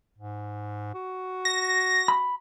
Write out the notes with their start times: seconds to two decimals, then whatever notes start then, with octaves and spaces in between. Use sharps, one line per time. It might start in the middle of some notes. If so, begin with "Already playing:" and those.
0.18 G#2
0.94 F#4
1.45 A#6
2.08 B5